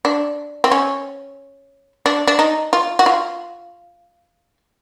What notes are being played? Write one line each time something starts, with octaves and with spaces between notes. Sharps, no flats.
D4
C4
C#4
D4
D4
D#4
F4
F#4
F4